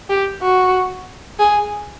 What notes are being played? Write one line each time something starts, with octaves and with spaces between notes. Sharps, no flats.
G4
F#4
G#4